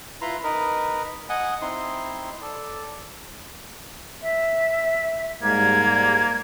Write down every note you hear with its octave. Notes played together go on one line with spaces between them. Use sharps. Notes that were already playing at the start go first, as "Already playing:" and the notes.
E4 F4 B4 A#5 C6
D#4 A#4 B4
D#5 F#5 G#5
C4 D#4 E4 C6
A4 D5
E5
G#2 G3 G#3 A#3 G#6